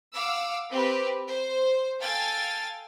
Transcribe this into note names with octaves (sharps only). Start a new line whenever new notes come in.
F5 F#5 D6 E6
C4 G4 B4
C5
A4 F5 G5 G#5 A6